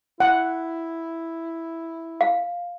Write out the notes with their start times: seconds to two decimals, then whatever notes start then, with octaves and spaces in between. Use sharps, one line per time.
0.20 E4 F#5
2.21 F5